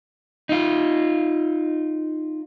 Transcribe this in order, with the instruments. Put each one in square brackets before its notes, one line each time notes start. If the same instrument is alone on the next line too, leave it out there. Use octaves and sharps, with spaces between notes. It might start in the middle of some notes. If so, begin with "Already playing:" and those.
[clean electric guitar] D#4 F4